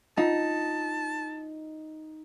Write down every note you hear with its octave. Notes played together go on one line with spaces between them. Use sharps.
D#4 F4 F#5 A5